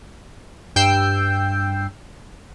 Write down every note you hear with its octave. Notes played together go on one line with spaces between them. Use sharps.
G2 G5 E6 G6 C7